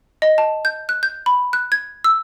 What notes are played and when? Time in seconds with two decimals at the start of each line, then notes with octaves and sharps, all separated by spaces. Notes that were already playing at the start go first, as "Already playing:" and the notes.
0.22 D#5
0.38 A5
0.65 G6
0.89 F#6
1.03 G6
1.26 B5
1.53 F#6
1.72 G#6
2.04 E6